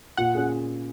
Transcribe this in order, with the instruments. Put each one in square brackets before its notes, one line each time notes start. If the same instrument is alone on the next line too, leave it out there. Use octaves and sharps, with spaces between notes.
[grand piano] A#2 [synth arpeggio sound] F#5
[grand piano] C#4 G#4